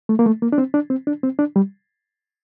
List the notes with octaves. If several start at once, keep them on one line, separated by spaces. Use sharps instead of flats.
A3
A#3
A3
A#3
D4
C4
D4
C4
D4
C4
D4
G3